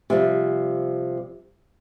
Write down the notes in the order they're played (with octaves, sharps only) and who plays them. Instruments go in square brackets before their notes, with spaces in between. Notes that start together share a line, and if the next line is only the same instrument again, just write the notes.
[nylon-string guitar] C3 F3 G3